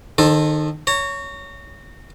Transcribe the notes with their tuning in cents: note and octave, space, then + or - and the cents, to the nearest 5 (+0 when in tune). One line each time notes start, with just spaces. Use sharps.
D#3 -25 A4 +0 C5 +20
C#5 +10 A#5 -30